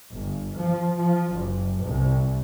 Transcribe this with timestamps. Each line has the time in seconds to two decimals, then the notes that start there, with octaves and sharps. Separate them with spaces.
0.13 G1
0.56 F3
0.98 F3
1.34 F#1
1.84 C2